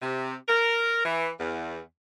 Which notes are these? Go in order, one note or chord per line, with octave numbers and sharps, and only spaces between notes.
C3
A#4
E3
E2